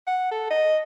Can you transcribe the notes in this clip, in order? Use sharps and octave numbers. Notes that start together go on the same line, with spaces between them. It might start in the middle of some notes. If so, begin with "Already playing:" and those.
F#5
A4
D#5